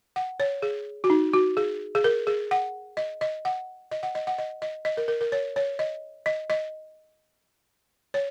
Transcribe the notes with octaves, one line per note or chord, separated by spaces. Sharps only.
F#5
C#5
G#4
F#4
D#4
F#4
G#4
G#4
A#4
G#4
F#5
D#5
D#5
F#5
D#5
F#5
D#5
F#5
D#5
D#5
D#5
A#4
A#4
A#4
C#5
C#5
D#5
D#5
D#5
C#5